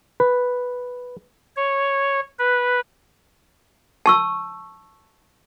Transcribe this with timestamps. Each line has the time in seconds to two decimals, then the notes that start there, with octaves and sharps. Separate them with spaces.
0.20 B4
1.56 C#5
2.39 B4
4.06 A5 C#6 E6